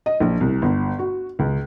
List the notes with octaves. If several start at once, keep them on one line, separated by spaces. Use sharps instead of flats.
D#5
A#1
C2
G1
F#4
C#2